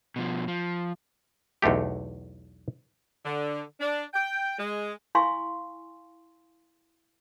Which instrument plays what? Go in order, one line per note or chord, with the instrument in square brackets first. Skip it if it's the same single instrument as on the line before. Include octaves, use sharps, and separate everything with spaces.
[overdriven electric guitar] B2 F3
F3
[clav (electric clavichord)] B1 E2 D3 A3 G4
[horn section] D3
D4
G5
G#3
[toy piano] E4 F5 G#5 C6 C#6